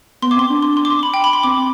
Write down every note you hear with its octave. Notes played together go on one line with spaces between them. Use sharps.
B3 C6
D6
C4 C6
D4
C6
C6
D6
C6
B5
G5
B5
C6
C4 D6